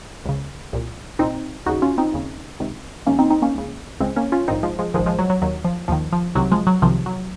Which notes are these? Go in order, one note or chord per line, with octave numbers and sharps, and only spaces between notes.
C#2 C#3
C2 A#2
C2 A#2 C4 D#4
D#2 C#3 D#4 F#4
C#4 F4
C4 D#4
D#2 C#3
C#2 C3 D#3
C#2 C3 D#3 A#3 C#4
C4 D#4
C4 D#4
A#3 C#4
C#2 C#3
C#2 C#3 G#3 C4
A#3 C#4
C#4 F4
A#1 G#2 D#3 C4 D#4
F3 G#3
F3 G#3
A#1 G#2 D#3 F3 G#3
F3 G#3
F#3
F#3
D#2 D#3 F#3
F3
D#2 D#3 F3
F3
C2 C3 D#3 F#3
F3 G#3
F#3
C2 C3 D#3 F3
F#3